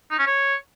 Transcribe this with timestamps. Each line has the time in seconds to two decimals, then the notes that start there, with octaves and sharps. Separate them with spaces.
0.11 D#4
0.19 C#4
0.27 C#5